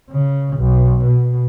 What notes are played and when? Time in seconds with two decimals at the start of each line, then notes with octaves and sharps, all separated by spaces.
0.10 C#3
0.57 B1
1.03 B2